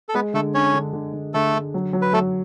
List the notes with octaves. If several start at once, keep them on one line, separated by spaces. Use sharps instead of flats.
A4
G#3 B3 B4
D3 A3 A4
C#4 D4 C#5
D3
D3
D3
D3 A3 A4
D3
F#3
F#3
B4
F#3 A3 A4